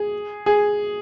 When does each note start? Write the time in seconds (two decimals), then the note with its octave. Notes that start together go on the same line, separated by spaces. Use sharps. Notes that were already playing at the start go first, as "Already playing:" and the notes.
Already playing: G#4
0.46 G#4